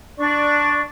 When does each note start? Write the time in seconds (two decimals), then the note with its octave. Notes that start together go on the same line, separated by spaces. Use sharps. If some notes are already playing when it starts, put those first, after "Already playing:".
0.18 D4 D5 C#6